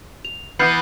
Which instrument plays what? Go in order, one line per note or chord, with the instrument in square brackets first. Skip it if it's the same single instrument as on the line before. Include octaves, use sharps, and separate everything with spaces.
[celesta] F7
[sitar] E3 B3 [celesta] F6 G6 C7